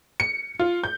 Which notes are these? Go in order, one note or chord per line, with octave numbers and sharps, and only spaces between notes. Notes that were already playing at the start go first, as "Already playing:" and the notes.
C#7
F4
G6